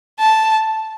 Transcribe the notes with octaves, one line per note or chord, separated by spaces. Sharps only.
A5